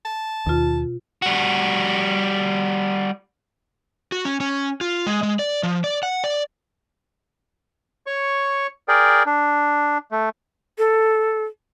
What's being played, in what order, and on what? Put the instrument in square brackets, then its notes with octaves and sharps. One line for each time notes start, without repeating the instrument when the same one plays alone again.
[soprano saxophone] A5
[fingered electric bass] D#2 [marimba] B2 F4
[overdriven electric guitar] G3 F#4
[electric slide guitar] F#4
C#4
C#4
F4
G#3
G#3
D5
F3
D5
F#5
D5
[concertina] C#5 C#6
G#4 A#4 D5 G5
D4
A3
[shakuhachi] A4